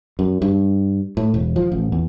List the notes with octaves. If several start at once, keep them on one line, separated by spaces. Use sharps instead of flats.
F#2
G2
A2
E1
F3
A1
E2